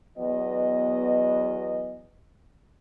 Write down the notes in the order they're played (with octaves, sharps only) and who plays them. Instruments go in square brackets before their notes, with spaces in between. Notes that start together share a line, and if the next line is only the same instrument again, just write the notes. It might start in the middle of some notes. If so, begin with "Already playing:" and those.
[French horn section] E2 F#3 B3 D#5